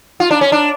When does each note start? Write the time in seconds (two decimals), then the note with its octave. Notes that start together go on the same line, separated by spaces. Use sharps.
0.20 F4
0.31 D4
0.41 C#4
0.52 D4